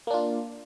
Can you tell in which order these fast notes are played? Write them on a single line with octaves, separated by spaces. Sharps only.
A#3 D4 F4